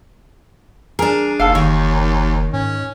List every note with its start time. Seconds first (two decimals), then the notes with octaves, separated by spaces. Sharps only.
0.99 D4 G#4 A#4
1.40 F#1 D#2 A4 F5
1.55 F#1 D#3 C#5
2.53 G#2 C#4